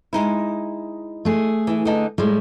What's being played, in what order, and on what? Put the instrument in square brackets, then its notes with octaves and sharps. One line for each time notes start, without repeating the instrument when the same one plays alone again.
[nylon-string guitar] G#3 D#4 E4
[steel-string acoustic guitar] A3 G#4
[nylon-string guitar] E3 E4
D3 D#4 A5
[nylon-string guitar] A2 [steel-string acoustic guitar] G3 G#3